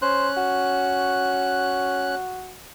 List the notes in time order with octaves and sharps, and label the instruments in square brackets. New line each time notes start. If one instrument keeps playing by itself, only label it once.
[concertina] C#4 F#6 [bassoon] C5
[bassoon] F#4